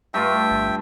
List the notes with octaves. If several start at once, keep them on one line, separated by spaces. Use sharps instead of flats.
G2 A3 F4 E5 G5
G1